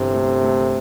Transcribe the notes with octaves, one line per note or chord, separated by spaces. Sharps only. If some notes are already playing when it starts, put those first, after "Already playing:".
Already playing: G1 C3 E3
A3
A3